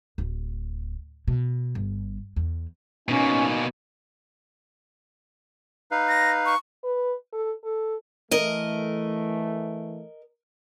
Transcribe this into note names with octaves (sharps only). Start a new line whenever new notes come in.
D1
B2
G1
E2
B2 A#3 C#4 D#4 G#5
D#4 B4 F5
A#6
C#6
B4
A4
A4
E3 A3 A#4 D#5